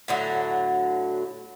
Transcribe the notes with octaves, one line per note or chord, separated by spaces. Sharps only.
A2 D3 F#3